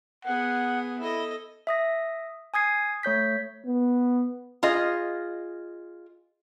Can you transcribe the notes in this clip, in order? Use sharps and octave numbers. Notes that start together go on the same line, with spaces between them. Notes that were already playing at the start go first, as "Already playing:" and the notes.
B3 G#4 F#5
E4 A4 D#5
E5 D#6 A#6
G#5 D#6 G#6 C7
A3 C#5 G6 B6
B3
F4 G#4 D#5